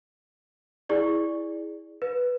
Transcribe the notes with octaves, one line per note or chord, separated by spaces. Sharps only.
E4 G#4 D5
B4